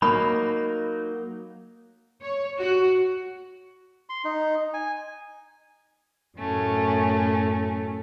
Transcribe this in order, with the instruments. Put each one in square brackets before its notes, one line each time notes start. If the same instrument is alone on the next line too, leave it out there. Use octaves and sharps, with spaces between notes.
[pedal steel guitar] F#3 D#4 [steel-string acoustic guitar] A#3 [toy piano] B5
[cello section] C#5
F#4
[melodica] C6
D#4
G#5
[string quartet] F#2 A2 A3 C#4